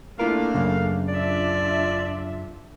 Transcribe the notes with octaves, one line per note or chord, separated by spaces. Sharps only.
A3 A#3 D4 E4 F4 A#4 F5
F#2 C#3
D4 F4 D5 E5